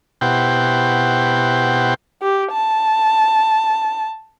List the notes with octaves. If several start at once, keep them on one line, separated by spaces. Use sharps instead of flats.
B2 E4 G4 C5 F#5 G5
G4
A5